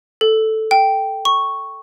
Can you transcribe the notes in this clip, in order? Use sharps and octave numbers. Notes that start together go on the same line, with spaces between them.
A4
G5
C#6